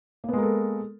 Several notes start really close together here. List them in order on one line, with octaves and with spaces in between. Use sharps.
A#3 B3 G#3 A#4 A4